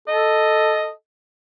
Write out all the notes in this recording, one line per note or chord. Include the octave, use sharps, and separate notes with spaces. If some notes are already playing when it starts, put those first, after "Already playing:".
A4 D#5